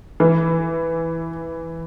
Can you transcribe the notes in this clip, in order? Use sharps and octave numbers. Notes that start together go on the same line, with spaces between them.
E3